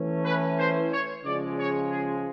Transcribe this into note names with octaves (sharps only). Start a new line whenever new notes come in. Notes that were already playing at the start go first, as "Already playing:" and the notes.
Already playing: E3 A3 C#4
B4
C5
C#5
C#3 F3 G#3 D5
C#5
G#4